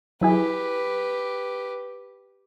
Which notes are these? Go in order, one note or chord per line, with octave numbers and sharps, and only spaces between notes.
F#3 E4 G4 G#4 B4